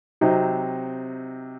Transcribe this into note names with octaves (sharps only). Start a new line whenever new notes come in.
C3 F#3 C4 D#4